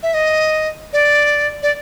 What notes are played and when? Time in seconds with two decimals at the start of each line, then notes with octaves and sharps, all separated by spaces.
0.03 E5
0.14 D#5
0.93 D5
1.63 D5